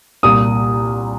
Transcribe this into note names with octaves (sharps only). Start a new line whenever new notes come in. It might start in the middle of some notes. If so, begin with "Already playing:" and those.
C2 A#2 D#6